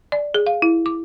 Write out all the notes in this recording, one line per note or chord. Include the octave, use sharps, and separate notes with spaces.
D5
G#4
F5
E4
D6